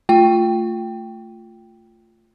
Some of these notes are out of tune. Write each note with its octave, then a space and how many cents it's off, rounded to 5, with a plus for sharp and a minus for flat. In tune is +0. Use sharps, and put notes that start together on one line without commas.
A3 +15 F4 +0 G5 +0